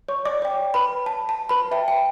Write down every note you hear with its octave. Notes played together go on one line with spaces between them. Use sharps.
C#5 C#6
D5 D6
C#5 G5
B4 B5
A5
A5
B4 B5
B4 E5 G5 A5
G5